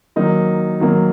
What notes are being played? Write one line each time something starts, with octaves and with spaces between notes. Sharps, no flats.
D#3 F#3 A#3 D#4
D#3 F#3 A#3 D#4